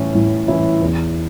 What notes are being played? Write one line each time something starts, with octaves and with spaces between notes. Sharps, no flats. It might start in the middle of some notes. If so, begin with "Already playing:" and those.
Already playing: A2 E3 C#4 E4
A2
E3 C#4 E4
E2